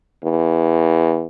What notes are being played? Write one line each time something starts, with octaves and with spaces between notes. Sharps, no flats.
E2